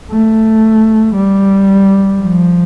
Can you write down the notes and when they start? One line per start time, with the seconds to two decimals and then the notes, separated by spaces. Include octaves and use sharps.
0.11 A3
1.16 G3
2.20 F3